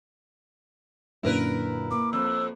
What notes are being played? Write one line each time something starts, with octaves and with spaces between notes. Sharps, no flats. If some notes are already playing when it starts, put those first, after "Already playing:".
F#2 A#2 D3 E4 A#4 B4
A#3 D6
F2 E6